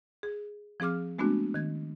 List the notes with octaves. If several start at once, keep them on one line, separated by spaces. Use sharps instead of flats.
G#4
F3 C4 G#4 D6 F6
G#3 A3 B3 C4 D4 F#4
D#3 G#6